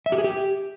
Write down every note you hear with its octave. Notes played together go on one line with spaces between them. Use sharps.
E5
G4
G#4
G4